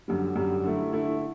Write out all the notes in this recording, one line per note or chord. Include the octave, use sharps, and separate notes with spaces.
F#2 D3 G3
F#2 D3 G3
D3 A3 E4
D3 A3 E4